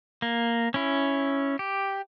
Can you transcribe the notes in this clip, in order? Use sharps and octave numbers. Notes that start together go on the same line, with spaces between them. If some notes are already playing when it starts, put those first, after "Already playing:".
A#3
C#4 E4
G4